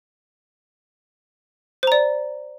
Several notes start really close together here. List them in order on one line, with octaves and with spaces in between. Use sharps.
C5 A#5 D5